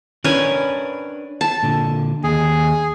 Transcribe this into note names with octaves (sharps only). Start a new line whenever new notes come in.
C#4 D4 A#4 B4 G#5
A5
A#2 D3
D#2 G#4